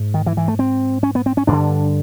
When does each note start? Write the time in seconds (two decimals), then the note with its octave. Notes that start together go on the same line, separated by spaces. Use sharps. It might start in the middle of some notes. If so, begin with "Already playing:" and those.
Already playing: G#2
0.14 D#3
0.26 E3
0.37 E3
0.48 A3
0.59 C4
1.03 C#4
1.15 B3
1.26 C4
1.37 C#4
1.47 G2 D3 D4